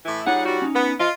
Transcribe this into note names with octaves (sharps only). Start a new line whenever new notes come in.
A2 E3 E4
G3 D#4 F4 G#4 C#5 F#5
G3 F#4
C#4 D#4
B3
F4 D#5